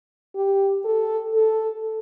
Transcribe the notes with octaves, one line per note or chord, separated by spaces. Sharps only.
G4
A4
A4